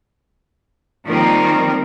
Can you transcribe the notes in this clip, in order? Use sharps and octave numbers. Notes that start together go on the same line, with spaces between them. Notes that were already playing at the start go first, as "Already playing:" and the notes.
D#3 F3 G3 A#3 C4 A#4